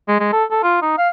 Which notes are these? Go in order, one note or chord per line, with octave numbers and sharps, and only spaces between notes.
G#3
G#3
A4
A4
F4
D#4
F5